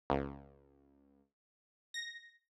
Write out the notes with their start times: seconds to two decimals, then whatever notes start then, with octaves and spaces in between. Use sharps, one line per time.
0.10 C#2
1.94 A#6